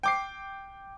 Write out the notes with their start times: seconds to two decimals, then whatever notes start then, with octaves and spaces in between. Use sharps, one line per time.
0.03 G5 D6 C7